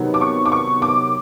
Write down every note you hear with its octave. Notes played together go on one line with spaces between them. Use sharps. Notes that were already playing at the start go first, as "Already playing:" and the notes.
Already playing: C3 D#3 F#3 B3
D6
C#6
D6
C#6
D6